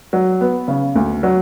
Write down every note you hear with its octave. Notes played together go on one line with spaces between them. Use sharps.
F#3
B3
C#3
D2
F#3